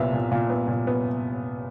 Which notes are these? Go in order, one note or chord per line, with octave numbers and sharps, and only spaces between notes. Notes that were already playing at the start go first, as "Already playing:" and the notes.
Already playing: C2 A#2 B3 E5 F5
A#2
A#2 F5
B3
A#2
B3